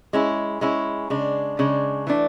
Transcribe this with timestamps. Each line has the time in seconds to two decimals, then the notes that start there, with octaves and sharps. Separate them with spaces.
0.13 G#3 C#4 E4
0.61 G#3 C#4 E4
1.10 C#3 G#3 D4
1.59 C#3 G#3 D4
2.07 E3 A3 D4